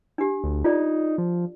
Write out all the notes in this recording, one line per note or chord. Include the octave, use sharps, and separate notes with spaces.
D4 G4
D2
D#4 F4 A4 D5
F3